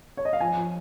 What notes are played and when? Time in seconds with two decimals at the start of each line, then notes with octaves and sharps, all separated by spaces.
0.17 C#5
0.25 D#5
0.33 F5
0.40 F3 G#5
0.56 F3